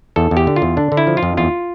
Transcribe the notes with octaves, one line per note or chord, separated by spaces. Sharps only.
E2 A4
E2
G4
D3
F4
E2
D3 D4
D3
E4
F3
F4
F2
E2 F4